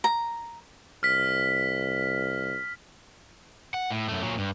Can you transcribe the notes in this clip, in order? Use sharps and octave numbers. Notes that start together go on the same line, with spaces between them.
A#5
C2 F6 B6
F#5
A2
F#2 A3
A#2 F#3
G2